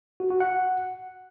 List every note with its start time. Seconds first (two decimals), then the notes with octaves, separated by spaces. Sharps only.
0.20 F#4
0.30 F#4
0.40 F#5